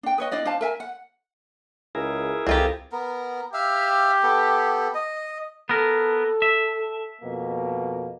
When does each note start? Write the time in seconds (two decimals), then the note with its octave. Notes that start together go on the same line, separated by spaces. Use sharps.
0.03 D4 G5
0.18 B4 C#5 D#5
0.31 D4 E4 D5 D#5
0.45 D4 C5 F5 A5
0.61 A#4 E5 G#5
0.80 F#5
1.95 C#2 E4 G#4 A#4
2.47 C2 F2 C4 F4 G4
2.92 B3 A#4
3.53 G4 E5 F5
4.23 B3 A4
4.94 D#5
5.69 B3 A4 A#4
6.42 E5
7.21 F2 B2 A#3